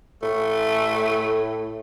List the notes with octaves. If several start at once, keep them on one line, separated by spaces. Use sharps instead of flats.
A2 A3